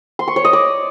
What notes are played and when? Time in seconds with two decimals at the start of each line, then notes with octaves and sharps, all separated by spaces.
0.19 C6
0.28 C#6
0.36 C#5
0.45 D#5
0.53 D5